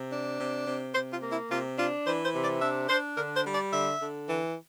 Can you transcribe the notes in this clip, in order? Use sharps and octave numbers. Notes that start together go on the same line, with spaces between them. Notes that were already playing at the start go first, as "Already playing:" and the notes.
Already playing: C3
D4
C3
C3
C3 C5
F4
A#3
E4
C3 F4
D4 F4
E3 C5
C5
C3
D5
D4 E5
D4 C5
D3 A#4
C5
G3
D5
D3 E5
D3
E3